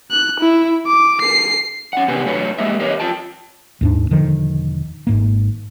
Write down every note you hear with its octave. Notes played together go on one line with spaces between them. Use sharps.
F#6
E4
D6
C7
C#4 F#5
C3 B3 G4 A#4 B4 G#5
F#3 A3 D4 B4 C#5 F5
G#3 A#3 G4 D#5 E5
G4 A#4 B4 C#5 D#5 F5
F4 G5 A5
D#2 G#2 D4
E1 D3 D#3 F3
G#1 G#2 A#3